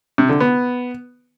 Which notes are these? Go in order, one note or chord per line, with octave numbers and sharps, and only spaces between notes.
C3
D3
B3